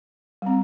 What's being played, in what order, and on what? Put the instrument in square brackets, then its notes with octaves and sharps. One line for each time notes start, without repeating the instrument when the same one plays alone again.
[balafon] G3 C4